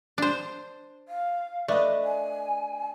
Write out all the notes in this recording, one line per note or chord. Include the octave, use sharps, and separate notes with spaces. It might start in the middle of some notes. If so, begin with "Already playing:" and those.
D4 C5
F5
A3 D4 B4 D#5
G#5